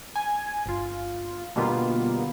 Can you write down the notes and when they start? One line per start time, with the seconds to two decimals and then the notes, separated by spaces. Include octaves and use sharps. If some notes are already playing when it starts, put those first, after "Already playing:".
0.16 G#5
0.66 G1 F4
1.56 B2 D3 G3 A#3 B3 F4